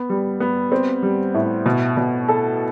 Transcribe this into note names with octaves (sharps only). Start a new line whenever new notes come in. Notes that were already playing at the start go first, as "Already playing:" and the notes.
Already playing: B3
G3
B3
C4
G3
A2
B2
B2
A4